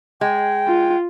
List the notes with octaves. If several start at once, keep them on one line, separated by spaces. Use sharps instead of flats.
G#3 G5
F4